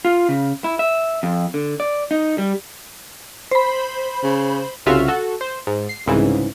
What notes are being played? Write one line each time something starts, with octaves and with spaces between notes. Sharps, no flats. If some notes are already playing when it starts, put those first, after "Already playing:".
F4
C#3
E4
E5
F2
D3
D5
D#4
G3
C5 B5
C#3
C2 C#3 F4 F#4 E5 F6
F#4 A4
C5
G#2
C7
C2 G#2 C#3 E3